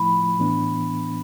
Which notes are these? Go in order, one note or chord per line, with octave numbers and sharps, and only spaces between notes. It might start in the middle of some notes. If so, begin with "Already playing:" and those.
Already playing: A2 F3 A3 E4 B5
A2 E3 B3 D4